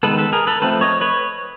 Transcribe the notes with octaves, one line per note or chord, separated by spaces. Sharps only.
D#3 G#3 B3 A4 B4
A4 B4
G#4 A#4
A4 B4
F3 A3 C4 A4 B4
C#5 D#5
B4 C#5